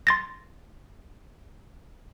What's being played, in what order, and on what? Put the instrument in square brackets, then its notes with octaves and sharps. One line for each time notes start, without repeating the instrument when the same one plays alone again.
[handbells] C6 A6 A#6